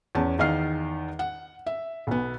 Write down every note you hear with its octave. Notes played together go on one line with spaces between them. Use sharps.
E2 C#4 A5
E2 D#3 D#5 F5 F6 C7
F#5
E5
B1 B3